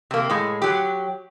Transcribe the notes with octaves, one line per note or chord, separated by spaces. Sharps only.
C3 A#3
A2 G#3
F#3 G4